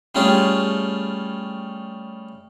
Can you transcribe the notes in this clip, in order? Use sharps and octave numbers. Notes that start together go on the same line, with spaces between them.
G3 A3 C#4 F4 G4 G#4